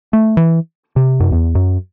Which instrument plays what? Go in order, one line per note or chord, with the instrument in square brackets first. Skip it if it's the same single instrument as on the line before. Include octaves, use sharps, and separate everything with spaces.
[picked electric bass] A3
E3
C3
F#2
E2
F#2